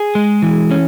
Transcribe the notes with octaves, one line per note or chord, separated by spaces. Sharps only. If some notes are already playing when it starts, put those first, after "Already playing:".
Already playing: G#4
G#3
E3
C#4